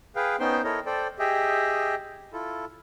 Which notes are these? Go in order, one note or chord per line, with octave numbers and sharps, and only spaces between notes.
G#4 B4 F5 G5
B3 C#4 D#4 C5 G5 C6
E4 A4 A#4 C#5 D#5
A4 C5 D5 G5
G4 G#4 D#5 E5 G5
E4 F4 A4